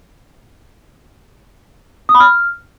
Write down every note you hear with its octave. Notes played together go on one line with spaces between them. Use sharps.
D#6
B5
F6